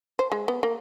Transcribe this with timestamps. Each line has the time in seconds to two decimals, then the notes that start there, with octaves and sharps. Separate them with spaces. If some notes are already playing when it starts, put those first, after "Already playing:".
0.19 C5
0.32 G#3
0.48 B3
0.63 A#3